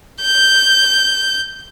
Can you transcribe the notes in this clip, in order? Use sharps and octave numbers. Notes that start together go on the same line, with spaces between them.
G6